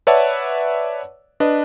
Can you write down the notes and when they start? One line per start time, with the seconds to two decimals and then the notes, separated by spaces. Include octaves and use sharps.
0.07 B4 C#5 D5 E5 F#5 A5
1.40 D4 B4 D#5